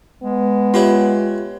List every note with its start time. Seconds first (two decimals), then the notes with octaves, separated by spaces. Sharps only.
0.22 G#3 B3
0.74 E4 F4 G4 B4 C#5 C6